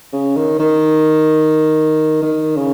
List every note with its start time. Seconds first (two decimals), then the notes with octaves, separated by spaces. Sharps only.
0.13 C#3
0.36 D#3
0.59 D#3
2.22 D#3
2.56 C#3